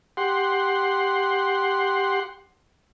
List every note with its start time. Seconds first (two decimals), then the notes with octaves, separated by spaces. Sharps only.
0.17 G4 F#5 C6